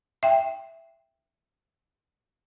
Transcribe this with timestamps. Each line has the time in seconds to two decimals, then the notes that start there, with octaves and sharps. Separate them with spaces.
0.23 E5 G5